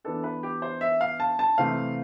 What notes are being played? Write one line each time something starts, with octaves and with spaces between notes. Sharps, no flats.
E3 B3 D4 A4
B4
G4
C5
E5
F5
A5
A5
C3 E3 A3 C4 F5